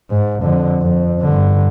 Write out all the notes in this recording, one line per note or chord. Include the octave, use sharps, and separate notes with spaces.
G#2
F2 D3
F2
G2 D3